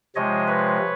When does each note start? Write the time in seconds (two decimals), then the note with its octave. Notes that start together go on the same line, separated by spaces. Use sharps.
0.15 C3 F3 G#3 C#5 D#5
0.48 B4 C#5